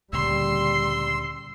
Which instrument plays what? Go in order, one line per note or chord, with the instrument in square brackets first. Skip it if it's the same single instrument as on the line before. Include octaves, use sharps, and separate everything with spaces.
[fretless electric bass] D2 A#2 C#3 [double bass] G3 [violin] C6 [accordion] E6